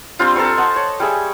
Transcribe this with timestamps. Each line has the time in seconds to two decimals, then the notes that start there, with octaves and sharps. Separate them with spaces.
0.19 G3 C4 D4 F4
0.36 A4 C5 A#5 C#6
0.57 D#5 F#5 A5
0.76 C#5
1.00 G3 G#4 E5